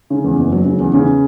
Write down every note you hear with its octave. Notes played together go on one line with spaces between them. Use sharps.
C#3
E2
F#1
F#3
C#3
E2
C#3